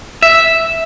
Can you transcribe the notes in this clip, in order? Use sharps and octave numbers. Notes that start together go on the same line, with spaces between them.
E5